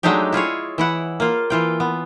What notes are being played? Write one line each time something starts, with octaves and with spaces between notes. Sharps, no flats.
F#3 G#3 A3 D4 D#4 G4
E4 F4 G#4 C#5
E3 E4 F#5
A#3 F4
E3 F4 G5
B3